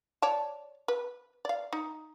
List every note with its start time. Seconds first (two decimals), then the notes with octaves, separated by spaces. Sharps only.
0.22 C#5 D5 A5
0.88 B4
1.45 D5 F5
1.73 D#4